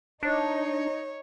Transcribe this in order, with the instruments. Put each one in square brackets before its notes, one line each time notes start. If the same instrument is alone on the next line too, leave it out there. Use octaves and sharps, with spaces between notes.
[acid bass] D4 [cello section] D#4 [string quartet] C#5